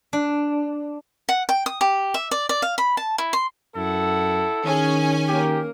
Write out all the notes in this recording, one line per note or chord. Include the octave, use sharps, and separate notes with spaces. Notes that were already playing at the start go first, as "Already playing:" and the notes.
D4
F#5
G5
D#6
G4
E5
D5
D5
F5
B5
A5
E4
C6
F#2 E4 A4 F#5
D#3 C#4 G#4 G#5
A#3 G4 A#4